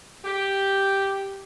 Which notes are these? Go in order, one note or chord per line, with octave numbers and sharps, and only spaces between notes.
G4